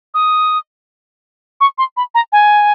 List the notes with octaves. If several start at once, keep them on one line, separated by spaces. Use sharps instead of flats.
D#6
C#6
C6
B5
A#5
G#5